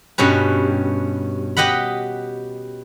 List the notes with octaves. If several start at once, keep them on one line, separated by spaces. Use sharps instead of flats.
G2 B2 C#4 B4
G4 B4 D#5 F#5 B5